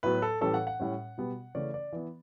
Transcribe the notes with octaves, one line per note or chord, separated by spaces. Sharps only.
A2 F#3 B3 B4
A4
A2 E3 G3 C#4 A4
F#5
F#5
A2 G3 C#4
B2 G3 B3
C#3 E3 A3 C#4 D5
D5
E3 B3